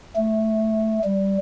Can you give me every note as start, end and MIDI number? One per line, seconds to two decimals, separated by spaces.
0.16 0.99 57
1.04 1.37 55